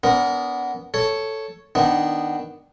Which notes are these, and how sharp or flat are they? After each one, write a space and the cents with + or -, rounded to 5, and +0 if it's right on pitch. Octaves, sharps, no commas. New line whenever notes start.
B3 +0 D4 -40 A#4 +0
A4 +0 C#5 +0
D#3 -5 B3 +0 D4 +0